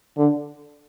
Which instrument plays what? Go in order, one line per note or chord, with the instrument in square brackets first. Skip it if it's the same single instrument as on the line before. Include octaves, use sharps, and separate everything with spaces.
[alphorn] D3